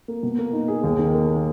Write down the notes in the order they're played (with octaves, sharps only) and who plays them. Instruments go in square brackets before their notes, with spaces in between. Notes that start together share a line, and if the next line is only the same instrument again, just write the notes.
[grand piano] A#3
B2
A#3
D#4
G#4
D#2
D#3
A#3